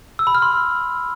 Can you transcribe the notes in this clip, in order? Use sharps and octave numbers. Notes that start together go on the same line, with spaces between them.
E6
B5
F6
C6